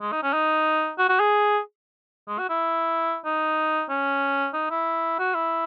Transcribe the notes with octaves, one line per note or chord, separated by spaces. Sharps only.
G#3
D#4
C#4
D#4
F#4
F#4
G#4
G#3
F#4
E4
D#4
C#4
D#4
E4
F#4
E4